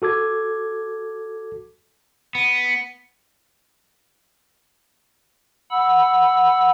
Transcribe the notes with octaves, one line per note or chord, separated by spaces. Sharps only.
F#4 A4 D6 G#6
B3
F#5 B5 E6